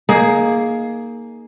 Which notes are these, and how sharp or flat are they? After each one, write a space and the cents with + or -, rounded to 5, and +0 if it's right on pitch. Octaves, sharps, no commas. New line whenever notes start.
A#3 +0 D#4 +0 G#4 +15